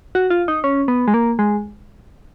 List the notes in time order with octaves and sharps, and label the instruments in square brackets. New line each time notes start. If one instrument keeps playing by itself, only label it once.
[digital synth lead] F#4
F4
D#4
C#4
B3
G#3
A#3
G#3